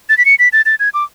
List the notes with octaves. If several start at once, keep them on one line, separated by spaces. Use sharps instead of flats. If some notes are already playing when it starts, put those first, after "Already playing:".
A6
B6
C#7
B6
A6
A6
G#6
D6